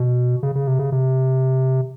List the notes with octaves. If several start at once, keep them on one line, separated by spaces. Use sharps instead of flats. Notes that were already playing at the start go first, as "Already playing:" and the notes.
Already playing: B2
C#3
C#3
C3
C#3
C3